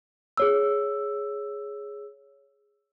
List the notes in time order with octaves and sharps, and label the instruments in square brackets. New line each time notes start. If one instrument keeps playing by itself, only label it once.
[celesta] G#4 C#5 E6